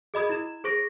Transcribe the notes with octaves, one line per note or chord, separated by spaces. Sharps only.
G#4 D#5 B5 D#6 G#6
E4 G#6 E7
G#4 C5 C#6 A#6 D7